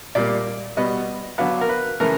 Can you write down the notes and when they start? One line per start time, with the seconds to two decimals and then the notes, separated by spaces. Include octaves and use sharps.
0.15 A#2 G3 A#3 D5
0.77 B2 G3 B3 D#5
1.38 D3 F#3 B3 F5
1.61 A#4
1.69 B4
2.00 C#3 E3 A3 A#4